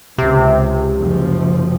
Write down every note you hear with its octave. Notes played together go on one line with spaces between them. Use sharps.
C#2 C3
F#1 F3